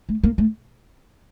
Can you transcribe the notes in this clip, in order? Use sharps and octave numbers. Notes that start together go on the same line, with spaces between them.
A3
A#3
A3